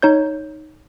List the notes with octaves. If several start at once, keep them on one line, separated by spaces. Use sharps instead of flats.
D#4 C#5 G6